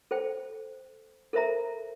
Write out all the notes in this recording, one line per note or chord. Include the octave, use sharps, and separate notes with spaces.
A4 C5 G5
A4 A#4 C5 E5 A#5